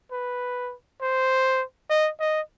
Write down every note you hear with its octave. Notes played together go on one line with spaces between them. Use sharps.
B4
C5
D#5
D#5